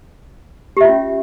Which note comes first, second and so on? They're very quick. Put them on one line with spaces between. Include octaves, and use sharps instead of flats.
G4 E5 F4 C#4